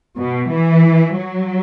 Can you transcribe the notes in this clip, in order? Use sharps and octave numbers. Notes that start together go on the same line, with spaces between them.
B2
E3
F#3